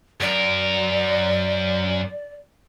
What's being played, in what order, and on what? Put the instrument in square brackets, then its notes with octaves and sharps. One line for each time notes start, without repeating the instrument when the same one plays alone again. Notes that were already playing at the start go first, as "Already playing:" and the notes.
[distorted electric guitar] F#2 A#4 [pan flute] D5